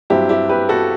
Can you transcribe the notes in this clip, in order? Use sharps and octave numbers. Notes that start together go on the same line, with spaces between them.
G2 F#3 C4 E4 G4
E4 G4
G4 B4
F#4 A4